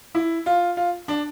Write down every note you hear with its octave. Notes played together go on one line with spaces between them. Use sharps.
E4
F4
F4
D4